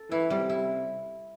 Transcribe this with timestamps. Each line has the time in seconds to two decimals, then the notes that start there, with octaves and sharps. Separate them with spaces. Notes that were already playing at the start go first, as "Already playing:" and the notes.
Already playing: A4
0.11 E3 E4
0.30 C3 G3
0.49 E4